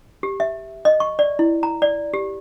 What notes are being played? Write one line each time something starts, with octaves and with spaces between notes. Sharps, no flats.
G4
E5
D#5
C#6
D5
E4
A#5
D5
G4